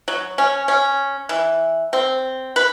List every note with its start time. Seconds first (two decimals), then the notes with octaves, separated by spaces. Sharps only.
0.08 F#3
0.38 C#4
0.68 C#4
1.29 E3
1.93 C4
2.56 B4